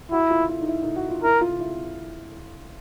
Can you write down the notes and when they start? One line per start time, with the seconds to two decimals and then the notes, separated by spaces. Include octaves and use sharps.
0.12 E4 F#4
0.31 F4
0.49 E4
0.61 D#4
0.68 E4
0.82 D#4
0.96 F#4
1.10 F4
1.24 E4 A#4
1.41 F4
1.60 E4